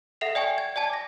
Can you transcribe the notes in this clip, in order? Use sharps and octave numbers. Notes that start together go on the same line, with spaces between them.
A4 E5 F#5 A#6 C7 F7
D5 G5 G#5 C#6
G#6
D5 G#5 A5 G#6
D6 A#6